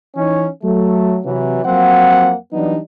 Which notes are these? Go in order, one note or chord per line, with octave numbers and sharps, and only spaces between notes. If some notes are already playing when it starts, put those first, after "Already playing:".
E3 C#4 D#4
F#3 A3
C3 E3 F#3
F2 F#3 A#3 C4 F#5
E3 F#3 G3 B3 D4 D#4